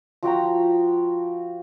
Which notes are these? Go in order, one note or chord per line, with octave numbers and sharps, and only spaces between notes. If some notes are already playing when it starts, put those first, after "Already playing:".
F3 F#4 G5 A#5